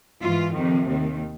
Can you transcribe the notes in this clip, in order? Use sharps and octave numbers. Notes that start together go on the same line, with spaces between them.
G#2 E3 F4
F2 C3 D#3
D#2 D#3